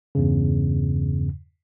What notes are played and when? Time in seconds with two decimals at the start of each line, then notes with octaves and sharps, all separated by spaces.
0.15 E2 G2 C#3